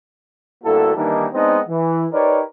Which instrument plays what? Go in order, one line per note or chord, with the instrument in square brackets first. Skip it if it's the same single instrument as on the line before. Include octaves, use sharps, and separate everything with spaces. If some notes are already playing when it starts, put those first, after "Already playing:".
[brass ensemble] D2 G2 A#3 E4 F#4 A4
D#3 E3 G3 A#3 D4 D#4
G#3 B3 C4 D4 D#4 D#5
E3
D#4 G4 A#4 B4 C#5 D5